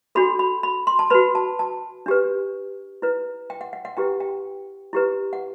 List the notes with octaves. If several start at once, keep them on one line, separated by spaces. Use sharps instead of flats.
D4 F#4 A4 B5
B5
B5
C6
A5
F#4 B4 B5
A5
A5
D4 G4 B4
E4 B4
G5
F#5
F#5
F#5
E4 G4 B4 G5
G5
E4 G4 B4
F#5